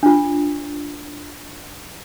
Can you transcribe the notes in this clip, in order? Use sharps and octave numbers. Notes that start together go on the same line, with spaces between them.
D4 F4